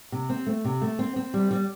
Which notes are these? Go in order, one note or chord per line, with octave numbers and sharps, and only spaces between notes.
C3
C4
A3
C3
A3
C4
C4
G3
G3